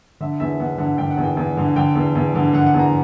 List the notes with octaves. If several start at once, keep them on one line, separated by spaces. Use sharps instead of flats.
D3 E5
E2 E5
E2 F#5
D3 F#5
D3 G5
F#5
E2
G5
E2
D3
D3 G5
E2
E2
D3
D3 F#5
F#5
E2
A#5